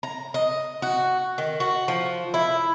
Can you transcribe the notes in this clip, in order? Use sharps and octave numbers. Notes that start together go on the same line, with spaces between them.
A#5
D#5
F#4
D#3
F#4
F3
E4